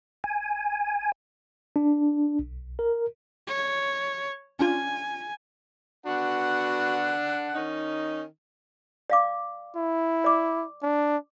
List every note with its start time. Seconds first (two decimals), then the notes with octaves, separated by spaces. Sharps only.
0.24 G#5
1.76 D4
2.39 B1
2.79 A#4
3.47 C#5
4.59 C#4 D4 F4 G#5
6.06 B3 D4 F#4 F#5
7.54 D#3 C#4 D#4
9.10 D5 F5 D6
9.76 E4
10.24 D5 D6
10.82 D4